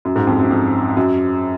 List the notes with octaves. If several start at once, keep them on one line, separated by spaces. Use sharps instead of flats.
F#2
G#2
F2
F#2
F2
F#2